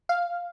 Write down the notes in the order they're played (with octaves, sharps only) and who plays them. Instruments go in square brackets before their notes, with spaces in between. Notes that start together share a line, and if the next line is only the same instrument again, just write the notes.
[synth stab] F5